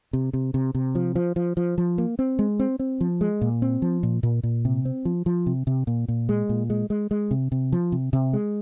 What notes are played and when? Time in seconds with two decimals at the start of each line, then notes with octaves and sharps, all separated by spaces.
0.13 C3
0.33 C3
0.54 C3
0.75 C3
0.95 F3
1.16 F3
1.36 F3
1.57 F3
1.78 F3
1.98 A#3
2.19 C4
2.39 G#3
2.59 C4
2.79 C4
3.01 F3
3.21 G#3
3.41 A#2
3.62 C4
3.82 F3
4.03 A#2
4.23 A#2
4.43 A#2
4.65 C3
4.85 C4
5.05 F3
5.26 F3
5.46 C3
5.67 C3
5.87 A#2
6.08 A#2
6.29 G#3
6.49 A#2
6.70 G#3
6.90 G#3
7.11 G#3
7.31 C3
7.52 C3
7.72 F3
7.92 C3
8.13 C3
8.33 G#3